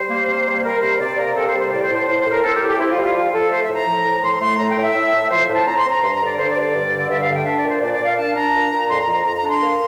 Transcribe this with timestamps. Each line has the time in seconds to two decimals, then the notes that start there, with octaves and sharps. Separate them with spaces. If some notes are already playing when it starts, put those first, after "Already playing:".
Already playing: G3 C5
0.10 A#3
0.28 C3
0.46 G3
0.64 G3 A#4
0.82 C3 C5
1.00 C3 D5
1.18 A#3 A#4
1.35 C3 A4
1.48 C5
1.54 G3
1.60 C5
1.71 A2 D5
1.83 C5
1.90 A2
1.96 C5
2.07 A2 C5
2.19 C5
2.25 A2
2.31 A#4
2.43 C4 A4
2.56 G4
2.61 A2
2.68 G4
2.79 C4 E4
2.91 F4
2.97 G3
3.03 F4
3.15 F3 F4
3.33 F3 A4
3.51 A3 C5
3.63 E5
3.69 A2
3.75 A#5
3.87 F3
4.05 A2
4.23 A2 C6
4.41 A3 C6
4.59 A2 A#5
4.71 G5
4.76 A2
4.83 E5
4.94 A2
5.13 A2
5.31 F3 C5
5.48 A2
5.54 A5
5.66 C4 A#5
5.78 C6
5.85 C4
5.90 A#5
6.02 G2 C6
6.14 A#5
6.20 D3
6.26 D5
6.38 D3 C5
6.50 D5
6.56 G2
6.62 D5
6.74 G2
6.92 D3
7.10 G2 E5
7.22 F5
7.28 A3
7.34 G5
7.46 D4 E5
7.58 D5
7.64 A#2
7.70 C5
7.82 A#2 D5
7.94 D5
8.00 A#2
8.05 F5
8.17 D4 A5
8.35 D4 A#5
8.54 A#2
8.71 A#2
8.89 F2 C6
9.02 A#5
9.07 F2
9.13 A#5
9.25 F2 A#5
9.37 A#5
9.43 D4
9.49 C6
9.61 A#3